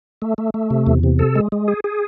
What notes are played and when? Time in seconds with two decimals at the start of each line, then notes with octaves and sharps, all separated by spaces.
0.22 A3
0.38 A3
0.54 A3
0.70 C3
0.87 E2
1.03 C3
1.19 A4
1.36 G#3
1.52 G#3
1.68 G#4
1.84 G#4